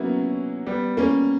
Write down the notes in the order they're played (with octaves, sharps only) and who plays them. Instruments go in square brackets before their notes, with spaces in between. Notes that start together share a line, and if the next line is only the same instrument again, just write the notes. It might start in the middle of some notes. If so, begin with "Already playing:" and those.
Already playing: [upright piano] F#3 A#3 B3 C#4 D4 E4
G3 B3
A#3 C#4